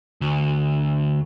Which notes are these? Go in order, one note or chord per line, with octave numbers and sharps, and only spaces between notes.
D2